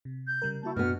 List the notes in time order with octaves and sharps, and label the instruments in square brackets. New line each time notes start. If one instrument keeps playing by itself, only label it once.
[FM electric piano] C3
[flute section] G6
[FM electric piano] C#3 G3 A#4
[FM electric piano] A#3 F#4 C#6 [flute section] E4 A5
[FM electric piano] F#2 D4 [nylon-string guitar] B2 B3 [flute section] F#4 F6